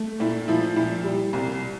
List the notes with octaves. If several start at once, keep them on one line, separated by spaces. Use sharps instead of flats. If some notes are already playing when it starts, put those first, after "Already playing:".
Already playing: A3
A#2 E4
F3 E4
A#2 E4
G3
C2